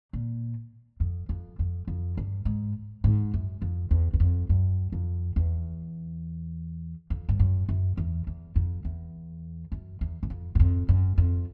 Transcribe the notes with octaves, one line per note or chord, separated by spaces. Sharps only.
A#2
F2
F2
F2
F2
G2
G#2
G#2
F#2
F2
E2
E2
F2
F#2
F2
E2
F2
G2
F#2
F#2
E2
E2
F2
E2
F#2
E2
F#2
F2
F#2
F2
F#2
F2